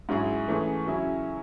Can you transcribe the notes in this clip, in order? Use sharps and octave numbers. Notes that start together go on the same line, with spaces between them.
G#2 F#3 C#4 E4 G#4
E3 A3 C#4 G#4
C#3 F#3 C#4 E4 G#4